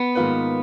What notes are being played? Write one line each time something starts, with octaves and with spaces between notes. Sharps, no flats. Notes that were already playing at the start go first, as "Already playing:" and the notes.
Already playing: B3
G#2 D#3 A#3 F4 B4